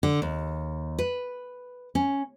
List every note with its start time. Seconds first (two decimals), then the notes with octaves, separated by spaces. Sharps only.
0.03 D3
0.22 D#2
0.99 B4
1.95 C#4